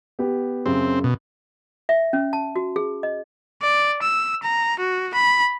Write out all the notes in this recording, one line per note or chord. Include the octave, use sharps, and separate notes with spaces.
B3 G4
F#2 C#3 C4
B2
E5
C#4
A5
F#4
G#4
D#5
D5
E6
A#5
F#4
B5